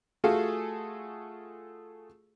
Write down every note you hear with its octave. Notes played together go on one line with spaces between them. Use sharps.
A3 F4 F#4 G#4 A4 F5